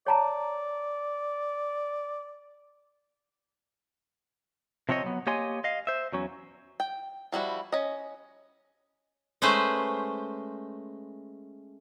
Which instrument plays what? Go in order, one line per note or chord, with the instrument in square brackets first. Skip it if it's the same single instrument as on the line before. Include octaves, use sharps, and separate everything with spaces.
[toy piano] C#5 A5 A#5 [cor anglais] D5
[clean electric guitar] C3 F3 C4 C#5 D#5
F#3 B3
A#3 G4 C#5 D#5 G#5 C6
D#5 F5
C5 E5
E2 F#3 C#4
[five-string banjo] G5
F3 G3 E4 F#4
C#4 D#5
[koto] G#3 A3 C#4 B4 C5